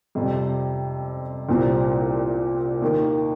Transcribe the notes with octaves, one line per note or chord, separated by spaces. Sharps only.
F2 C3 G3
C2 A#2 G3 C4
D#2 D#3 A#3